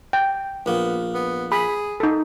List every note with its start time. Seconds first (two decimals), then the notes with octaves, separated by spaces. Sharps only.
0.13 G5
0.66 A#1 A#3 B3
1.15 B3
1.52 G#4 B5
2.00 D#4 A4